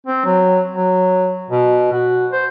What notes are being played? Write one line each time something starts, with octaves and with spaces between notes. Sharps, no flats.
C4
F#3
F#3
B2
F#4
C5